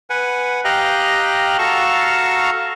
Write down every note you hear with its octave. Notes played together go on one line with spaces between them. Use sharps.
B4 F#5 G#5
G4 D#5 F5 G5 A#5 F#6
F#4 A4 F5 A5 A#5 C#6